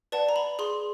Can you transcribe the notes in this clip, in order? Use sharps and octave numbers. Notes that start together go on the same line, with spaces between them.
B4 D5 F#5 A5
A#5
B5
G#4 C6